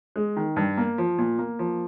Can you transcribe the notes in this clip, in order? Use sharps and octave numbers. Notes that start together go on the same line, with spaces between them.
G#3
D#3
G2
A#3
F3
A#2
A#3
F3